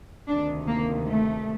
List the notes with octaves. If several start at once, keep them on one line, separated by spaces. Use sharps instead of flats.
D2 C3 D#3 D4
A#3
A3